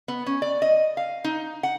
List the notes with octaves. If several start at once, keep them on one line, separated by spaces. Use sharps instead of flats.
B3
C#4
D5
D#5
F5
D#4
F#5